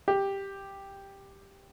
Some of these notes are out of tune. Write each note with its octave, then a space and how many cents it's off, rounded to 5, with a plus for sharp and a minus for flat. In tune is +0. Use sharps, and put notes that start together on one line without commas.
G4 +5